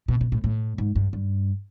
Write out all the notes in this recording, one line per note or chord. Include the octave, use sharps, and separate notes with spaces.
B2
B2
A2
A2
G#2
G2
G2